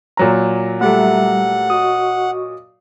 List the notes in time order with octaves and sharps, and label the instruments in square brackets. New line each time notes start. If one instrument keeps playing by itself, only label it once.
[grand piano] A#2 F#3 A#5
[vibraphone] G3 E5 [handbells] A3 G4 A4 [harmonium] F#5
[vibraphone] F#4 D#5 C#6 [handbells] D#6